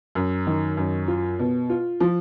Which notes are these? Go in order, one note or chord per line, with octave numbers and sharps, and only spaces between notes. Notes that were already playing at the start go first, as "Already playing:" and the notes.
F#2
D#3
F#2
F4
B2
F4
F3